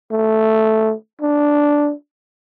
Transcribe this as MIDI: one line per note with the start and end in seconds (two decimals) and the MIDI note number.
0.12 0.93 57
1.22 1.92 62